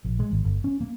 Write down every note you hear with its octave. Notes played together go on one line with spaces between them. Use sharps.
A#1
G#3
G#1
G1
C#4
A#3